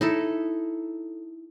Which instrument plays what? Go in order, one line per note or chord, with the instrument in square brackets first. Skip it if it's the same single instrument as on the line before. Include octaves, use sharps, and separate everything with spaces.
[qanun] D#4 E4 A4